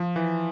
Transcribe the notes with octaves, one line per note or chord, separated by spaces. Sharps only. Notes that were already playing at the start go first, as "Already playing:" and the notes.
Already playing: F3
E3